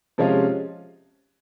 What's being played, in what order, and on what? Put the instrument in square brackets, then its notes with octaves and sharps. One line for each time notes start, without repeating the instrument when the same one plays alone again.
[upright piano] C3 F3 G#3 C#4 F4